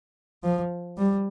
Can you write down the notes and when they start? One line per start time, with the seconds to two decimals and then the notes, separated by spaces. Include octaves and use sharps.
0.44 F3
0.98 G3